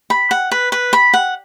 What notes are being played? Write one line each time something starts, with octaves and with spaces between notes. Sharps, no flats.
B5
F#5
B4
B4
B5
F#5